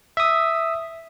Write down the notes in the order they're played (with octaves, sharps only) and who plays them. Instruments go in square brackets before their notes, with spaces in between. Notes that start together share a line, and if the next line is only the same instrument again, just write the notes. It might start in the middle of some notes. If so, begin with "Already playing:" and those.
[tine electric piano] E5 D#6